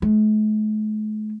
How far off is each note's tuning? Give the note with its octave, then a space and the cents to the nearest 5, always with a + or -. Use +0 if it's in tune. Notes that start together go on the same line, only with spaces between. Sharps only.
A3 -45